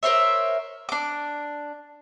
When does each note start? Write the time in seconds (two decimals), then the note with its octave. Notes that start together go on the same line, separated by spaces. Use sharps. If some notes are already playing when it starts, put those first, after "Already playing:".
0.03 A#4 C5 C#5 E5
0.89 D4 D6